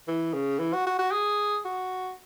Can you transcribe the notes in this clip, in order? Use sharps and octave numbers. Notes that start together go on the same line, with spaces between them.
E3
C#3
E3
F#4
F#4
F#4
G#4
F#4